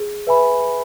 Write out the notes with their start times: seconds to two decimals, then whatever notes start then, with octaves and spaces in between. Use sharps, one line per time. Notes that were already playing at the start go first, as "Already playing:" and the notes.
Already playing: G#4
0.27 B4 E5 G#5 B5